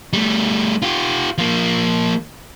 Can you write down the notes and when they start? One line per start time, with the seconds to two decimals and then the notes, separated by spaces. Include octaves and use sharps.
0.13 G3 A3
0.82 F4 G4
1.38 F3 A#3